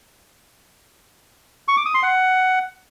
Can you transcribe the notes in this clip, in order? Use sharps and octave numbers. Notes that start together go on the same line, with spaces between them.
C#6
D6
D#6
C6
F#5